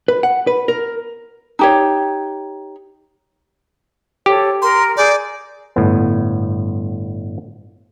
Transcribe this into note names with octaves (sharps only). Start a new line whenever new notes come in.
B4
F#5
B4
A#4
D#4 G4 C#5
G4 A4 C5 C#5
A#4 A#5 C6
G#4 D5 G6
G1 A2 B3